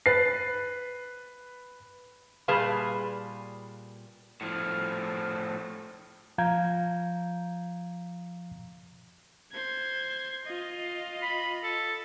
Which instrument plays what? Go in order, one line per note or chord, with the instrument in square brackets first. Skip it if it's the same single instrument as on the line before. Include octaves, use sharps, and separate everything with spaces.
[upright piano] B4 A6 C7
[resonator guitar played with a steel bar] A#2 G3 G#4 B4 F5 A5
[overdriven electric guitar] A2 F3
[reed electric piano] F3 F5 A#5 G6 G#6
[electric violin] C5 G#6
F4 D#5
[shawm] B5
A4